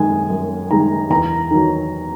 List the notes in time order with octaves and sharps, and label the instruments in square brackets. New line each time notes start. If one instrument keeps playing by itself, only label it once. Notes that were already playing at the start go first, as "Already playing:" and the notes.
Already playing: [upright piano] F#2 D#3 G#3 G#5
F#2
D#3 G#3 A#5
E2 A#5
D#3 F#3